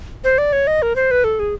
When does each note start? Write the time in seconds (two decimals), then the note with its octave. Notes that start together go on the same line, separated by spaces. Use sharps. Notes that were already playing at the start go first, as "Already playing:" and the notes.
0.24 C5
0.38 D5
0.53 C#5
0.67 D#5
0.82 A#4
0.96 C5
1.11 B4
1.24 A4
1.39 G#4